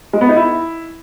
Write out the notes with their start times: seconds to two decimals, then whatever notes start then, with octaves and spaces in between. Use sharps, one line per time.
0.13 G#3
0.21 B3
0.29 D#4
0.36 E4